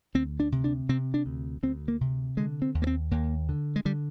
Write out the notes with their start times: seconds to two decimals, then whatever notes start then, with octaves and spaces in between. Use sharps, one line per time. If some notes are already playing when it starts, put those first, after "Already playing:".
0.15 D2 C4
0.40 D4
0.52 C3
0.64 D4
0.89 C3 C4
1.14 D4
1.26 D2
1.63 D2 C4
1.88 A#3
2.01 C3
2.37 D3 G#3
2.62 C4
2.75 D#2
2.82 A#3
2.87 C4
3.11 D#2 A#3
3.49 D3
3.76 G#3
3.85 D3 G3